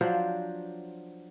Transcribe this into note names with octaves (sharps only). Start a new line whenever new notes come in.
F3 F#3 D4 C5